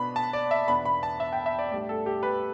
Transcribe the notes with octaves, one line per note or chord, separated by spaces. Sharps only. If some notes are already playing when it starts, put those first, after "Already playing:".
Already playing: B2 B3 D4 B5
A5
D5
E5
E2 B2 B3 D4 B5
B5
A5
E5
G5
E5
D5
A2 G3 D4 D5
A4
G4
B4